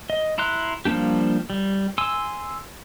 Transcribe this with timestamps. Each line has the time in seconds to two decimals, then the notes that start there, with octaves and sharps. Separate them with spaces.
0.10 D#5
0.38 E4 A#5 C6 F#6
0.85 F3 G3 A#3 D4 G4
1.50 G3
1.98 G#5 C6 E6